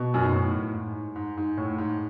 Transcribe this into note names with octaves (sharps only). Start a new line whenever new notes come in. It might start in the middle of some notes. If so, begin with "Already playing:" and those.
Already playing: B2
F#2
G#2
A2
G#2
G#2
G#2
A2
G#2